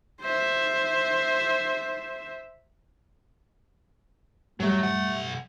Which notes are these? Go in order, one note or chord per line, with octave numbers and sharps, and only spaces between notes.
C5 E5
F#2 A2 F#3 G3 A3
B1 F#5